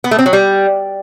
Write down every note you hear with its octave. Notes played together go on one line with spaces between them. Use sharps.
B3
A3
C4
F#3
G3